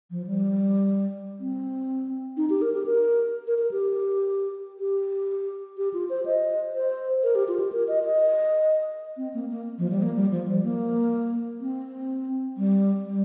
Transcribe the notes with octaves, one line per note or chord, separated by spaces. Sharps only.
F3
G3
C4
D#4
G4
A#4
G4
A#4
A#4
A#4
G4
G4
G4
F4
C5
D#5
C5
A#4
G4
F4
G4
A#4
D#5
D#5
C4
A#3
A#3
F3
G3
A#3
G3
F3
G3
A#3
C4
G3
G3